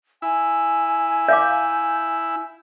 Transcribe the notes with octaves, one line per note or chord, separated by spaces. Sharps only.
E4 G#5
E5 F5 D6 G6